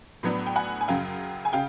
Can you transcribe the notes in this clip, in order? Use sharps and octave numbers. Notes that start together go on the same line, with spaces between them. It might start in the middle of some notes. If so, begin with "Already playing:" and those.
A2 F#3 B3 D4
G5
F#5 G#5
G#5
F#2 C#3 F#3 F5 G5
G#5
C#3 F5 G5